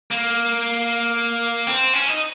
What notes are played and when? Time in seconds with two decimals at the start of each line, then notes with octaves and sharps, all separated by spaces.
0.11 A#3
1.67 C4
1.93 C#4
2.08 D#4